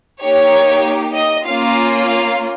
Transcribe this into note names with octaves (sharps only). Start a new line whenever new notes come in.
A#3 D#4 G4 C#5
D#5
A#3 C#4 F4 F5
F5